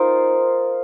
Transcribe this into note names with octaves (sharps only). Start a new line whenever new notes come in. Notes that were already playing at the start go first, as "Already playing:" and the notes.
Already playing: D#4 F4 A#4 C5